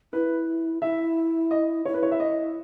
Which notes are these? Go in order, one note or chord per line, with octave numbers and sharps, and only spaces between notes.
E4 B4
E4 E5
D#5
E4 C#5
B4
C#5
E5
D#5